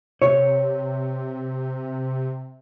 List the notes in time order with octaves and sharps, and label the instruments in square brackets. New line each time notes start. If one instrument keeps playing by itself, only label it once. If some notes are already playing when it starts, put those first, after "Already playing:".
[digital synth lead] C3 [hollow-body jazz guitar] C#5